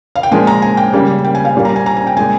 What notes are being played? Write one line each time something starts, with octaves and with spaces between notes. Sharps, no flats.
F5
G5
A#2 F3 G#3 G#5
A#5
G#5
G5
C#3 G3 A#3
G5
G#5
F5
A#2 G3 A#3
A#5
G#5
A#5
G#5
G5
A#2 G#3 G#5